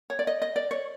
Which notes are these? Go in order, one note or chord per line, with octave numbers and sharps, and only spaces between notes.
C#5
D5
D#5
D#5
D5
C#5